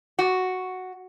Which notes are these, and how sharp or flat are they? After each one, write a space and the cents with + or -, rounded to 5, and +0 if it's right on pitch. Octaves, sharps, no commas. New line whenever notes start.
F#4 +0